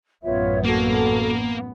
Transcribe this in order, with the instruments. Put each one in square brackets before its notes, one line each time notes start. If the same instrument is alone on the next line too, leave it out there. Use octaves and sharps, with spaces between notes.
[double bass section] A1 F#2 B3 [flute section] F4 C#5 E5
[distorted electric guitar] A#3 [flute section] F#4 A4